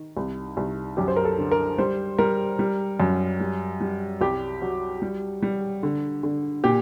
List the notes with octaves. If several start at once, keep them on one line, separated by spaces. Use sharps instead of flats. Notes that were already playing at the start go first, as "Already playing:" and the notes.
Already playing: D#3
C2
C2
F#2 G4
C5
A#4
A4
D3
A#4
G3 C5
G3 A#4
G3
F#2
G3
G3
C2 G4
F#3
G3
G3
D3
D3
A#2 G4